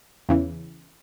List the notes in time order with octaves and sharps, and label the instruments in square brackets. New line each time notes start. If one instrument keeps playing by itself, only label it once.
[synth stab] E2 C#3 E3